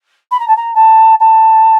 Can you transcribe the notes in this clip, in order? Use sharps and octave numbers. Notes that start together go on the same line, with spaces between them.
B5
A#5
A5
A#5
A5
A5